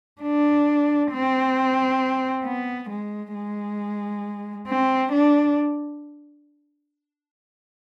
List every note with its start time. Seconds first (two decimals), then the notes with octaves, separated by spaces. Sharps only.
0.22 D4
1.11 C4
2.44 B3
2.90 G#3
3.34 G#3
4.68 C4
5.12 D4